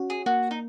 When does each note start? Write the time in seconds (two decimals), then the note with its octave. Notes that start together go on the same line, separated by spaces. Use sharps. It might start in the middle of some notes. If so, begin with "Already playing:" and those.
Already playing: C#4 F#4
0.10 G#4
0.26 A#3 F#4
0.51 D#4